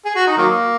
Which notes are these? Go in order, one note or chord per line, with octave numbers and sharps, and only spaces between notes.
G#4
F#4
D#4
D#3 F#3 A#3